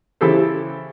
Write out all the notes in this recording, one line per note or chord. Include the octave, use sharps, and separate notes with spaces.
C#3 E3 E4 G4 A4 C5